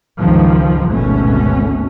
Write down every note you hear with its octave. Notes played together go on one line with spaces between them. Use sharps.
C#2 G2 D#3 F3
G#1 D2 B2 A3 C#4